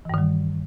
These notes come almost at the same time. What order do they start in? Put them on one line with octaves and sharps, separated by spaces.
E3 G2 D#3 G3